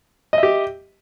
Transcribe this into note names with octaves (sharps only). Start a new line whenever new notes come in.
G4 D#5 E5